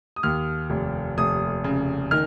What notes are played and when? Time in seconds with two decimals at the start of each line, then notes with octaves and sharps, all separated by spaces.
0.16 D#6
0.23 D#2 F6
0.70 F1
1.18 F1 D#6
1.64 C#3
2.11 D#3 F6